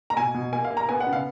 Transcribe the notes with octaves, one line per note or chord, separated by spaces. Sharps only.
A#5
B2 G#5
B2
A#3 G#5
F5
A#3
A#5
B3 G#5
F#5
C#3
F5